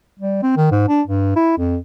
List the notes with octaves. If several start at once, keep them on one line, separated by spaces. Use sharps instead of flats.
G3
C4
D#3
G#2
D4
G2
E4
F2